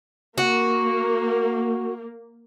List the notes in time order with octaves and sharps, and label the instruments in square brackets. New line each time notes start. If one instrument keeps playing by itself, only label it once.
[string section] A#3 [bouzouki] F#4